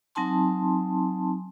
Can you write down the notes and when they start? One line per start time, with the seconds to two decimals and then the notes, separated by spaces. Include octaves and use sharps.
0.15 F#3 C4 D#4 G#5 A5 C6